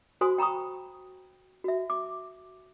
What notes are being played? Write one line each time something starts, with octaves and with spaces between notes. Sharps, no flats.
F#4 C5 G#5 C6 D#6
G5 A#5 B5 C#6 D#6
F#4 E5
D6